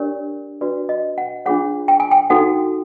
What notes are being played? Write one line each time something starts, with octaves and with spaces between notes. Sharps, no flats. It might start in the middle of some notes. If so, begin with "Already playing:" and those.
Already playing: D4 G4 A#4 C#5 D5
D4 F#4 B4 D5
D#5
F#5
D4 F4 G#4 C#5 F#5
G5
G#5
G5
D#4 F#4 A4 F#5